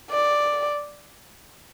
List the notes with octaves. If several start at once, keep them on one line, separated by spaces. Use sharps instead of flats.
D5